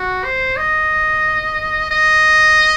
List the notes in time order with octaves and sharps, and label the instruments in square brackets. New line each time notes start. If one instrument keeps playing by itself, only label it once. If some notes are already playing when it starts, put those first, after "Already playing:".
Already playing: [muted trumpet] F#4
C5
D#5
D#5